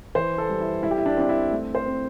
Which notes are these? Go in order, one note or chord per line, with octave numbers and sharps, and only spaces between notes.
E3 C5
A4
G3
E4
G3 E4
G4
E4
D4
C4 D4
E4
A3
C5
C4